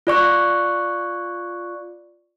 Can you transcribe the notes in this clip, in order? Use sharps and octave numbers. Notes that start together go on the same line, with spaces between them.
F4 D5 C#6 F#6